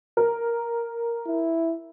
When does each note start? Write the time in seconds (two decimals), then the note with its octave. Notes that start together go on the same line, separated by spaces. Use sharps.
0.17 A#4
1.26 E4